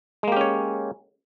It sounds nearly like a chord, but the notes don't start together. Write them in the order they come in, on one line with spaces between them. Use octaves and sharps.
G#3 A#3 G4 C#4 C#5